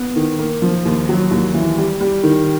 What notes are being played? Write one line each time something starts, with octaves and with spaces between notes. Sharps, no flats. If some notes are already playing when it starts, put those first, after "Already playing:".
Already playing: B3
D#3
A#3
F3
D#2
F#3
D#2
E3
G3
G3
D#3